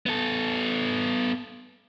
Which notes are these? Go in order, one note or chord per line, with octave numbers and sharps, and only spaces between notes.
B3 A4